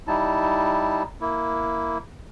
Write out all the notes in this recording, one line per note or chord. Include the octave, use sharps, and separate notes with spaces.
G3 D#4 E4 A5
A#3 E4